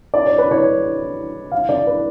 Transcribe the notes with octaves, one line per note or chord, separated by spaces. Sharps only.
D5
C#5
B4
C#5
F5
D5
B4